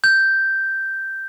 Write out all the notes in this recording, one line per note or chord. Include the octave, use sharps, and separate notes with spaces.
G6